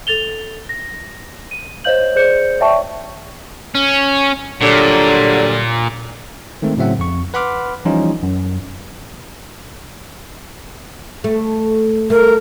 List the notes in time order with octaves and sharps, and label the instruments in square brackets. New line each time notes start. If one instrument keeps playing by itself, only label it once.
[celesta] A4 A6 F7 G7
A#6
D#7
C5 C#5 D#5 F5 G6 F#7
G#4 C5 D5 G6 C#7
C#5 D5 E5 G5 A5 C#6
[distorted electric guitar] C#4
[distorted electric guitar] A#2 [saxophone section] D3 F#3 G3
[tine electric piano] D#3 G#3 A3 C4
A2 C#3 F#3 C4 E5 F#5
F2 C#6
B4 F#5 B5 C6 D6 F6
E3 F3 G3 C#4 D#4 F4
F#2
[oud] A3
[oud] A3 [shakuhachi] A#4